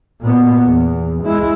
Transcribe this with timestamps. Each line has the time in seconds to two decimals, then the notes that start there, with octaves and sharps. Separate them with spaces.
0.21 A#2 B3
0.65 E2
1.24 G#3 E4